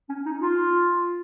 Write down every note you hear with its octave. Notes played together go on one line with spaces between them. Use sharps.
C#4
D#4
F4